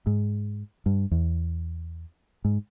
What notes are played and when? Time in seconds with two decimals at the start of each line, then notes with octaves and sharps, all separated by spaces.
0.07 G#2
0.86 G2
1.11 E2
2.45 G#2